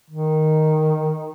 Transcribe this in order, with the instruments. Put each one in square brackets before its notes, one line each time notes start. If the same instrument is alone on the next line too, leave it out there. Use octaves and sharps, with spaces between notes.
[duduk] D#3